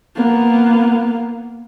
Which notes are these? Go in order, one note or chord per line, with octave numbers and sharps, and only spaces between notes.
A#3 B3